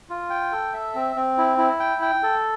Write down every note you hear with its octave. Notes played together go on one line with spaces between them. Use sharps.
F4
G5
A4
E5
C4
C4
E4
E4
G5
G5
A4